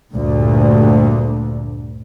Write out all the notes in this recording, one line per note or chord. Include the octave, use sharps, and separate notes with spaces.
D2 G2 A#2 D3